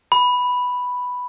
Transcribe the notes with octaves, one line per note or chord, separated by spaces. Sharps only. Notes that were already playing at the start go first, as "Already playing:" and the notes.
B5